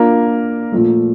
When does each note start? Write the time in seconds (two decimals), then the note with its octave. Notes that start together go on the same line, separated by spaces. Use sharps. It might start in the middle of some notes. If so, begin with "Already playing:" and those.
Already playing: A#3 D4 F4 A#4
0.72 A#2 F3 A3